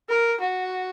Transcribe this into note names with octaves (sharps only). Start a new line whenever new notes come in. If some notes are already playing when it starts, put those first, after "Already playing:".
A#4
F#4